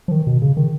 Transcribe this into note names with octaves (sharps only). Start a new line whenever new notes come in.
F3
D#3
B2
C#3
D#3